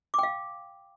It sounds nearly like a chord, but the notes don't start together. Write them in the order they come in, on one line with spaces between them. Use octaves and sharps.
D6 G5 F5